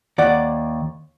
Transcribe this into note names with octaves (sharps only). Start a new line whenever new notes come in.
D#2 D5 F#5